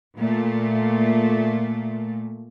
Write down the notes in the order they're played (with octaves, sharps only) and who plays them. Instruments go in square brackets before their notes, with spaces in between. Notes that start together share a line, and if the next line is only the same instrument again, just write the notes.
[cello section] A#2 A3